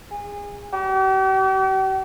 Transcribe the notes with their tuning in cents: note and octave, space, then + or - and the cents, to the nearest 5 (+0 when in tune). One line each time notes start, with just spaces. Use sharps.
G#4 -30
G4 -45